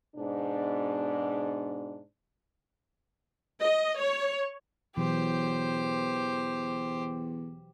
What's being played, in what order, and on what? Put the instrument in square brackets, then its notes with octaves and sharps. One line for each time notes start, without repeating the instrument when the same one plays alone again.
[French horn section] G#2 B2 D4
[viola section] D#5
C#5
[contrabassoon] E2 [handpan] B2 E3 F#3 [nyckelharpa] G4 C5